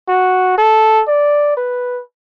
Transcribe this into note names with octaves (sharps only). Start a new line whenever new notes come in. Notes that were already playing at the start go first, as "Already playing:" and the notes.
F#4
A4
D5
B4